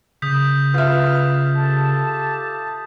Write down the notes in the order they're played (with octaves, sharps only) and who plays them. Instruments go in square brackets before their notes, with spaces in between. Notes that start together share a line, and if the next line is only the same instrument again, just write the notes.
[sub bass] C#3 [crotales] D#6 G6 B6
[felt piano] F4 E5 [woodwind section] B4 F6
[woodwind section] G4 A4 A5